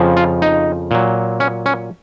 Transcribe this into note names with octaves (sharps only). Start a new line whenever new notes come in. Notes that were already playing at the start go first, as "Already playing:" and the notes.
Already playing: F2 C#3 F3
F4
D#4
A#2 F#3
C#4
C#4